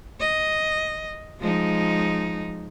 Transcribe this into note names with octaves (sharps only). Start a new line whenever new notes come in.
D#5
F3 G#3 D#4